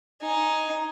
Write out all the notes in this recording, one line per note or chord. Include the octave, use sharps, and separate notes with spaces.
D#4 G#5